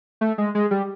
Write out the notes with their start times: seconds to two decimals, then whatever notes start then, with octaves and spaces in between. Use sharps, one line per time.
0.21 A3
0.38 G#3
0.55 G#3
0.71 G3